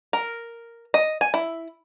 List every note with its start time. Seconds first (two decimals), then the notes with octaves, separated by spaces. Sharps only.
0.13 A#4
0.94 D#5
1.21 G#5
1.34 E4